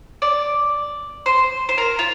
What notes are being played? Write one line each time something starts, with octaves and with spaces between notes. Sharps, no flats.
D5
C5
C5
A#4
F4